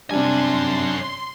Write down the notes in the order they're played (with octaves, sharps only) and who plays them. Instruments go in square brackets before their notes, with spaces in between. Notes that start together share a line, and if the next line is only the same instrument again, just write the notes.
[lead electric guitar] F#2 G#5 [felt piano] C3 G3 [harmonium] D4 [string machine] C6